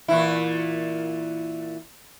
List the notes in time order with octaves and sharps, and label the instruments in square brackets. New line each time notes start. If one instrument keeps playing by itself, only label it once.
[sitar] A#2 E3 E4